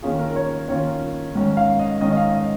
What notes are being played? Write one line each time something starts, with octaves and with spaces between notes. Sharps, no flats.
D#3 A#3 C#4 F4 G#4
A#4
C#5
D#3 A#3 C#4 F4 C#5
G#2 D#3 C#4
F5
D#5
G#2 D#3 C#4 D#5
D#5
F5
D#5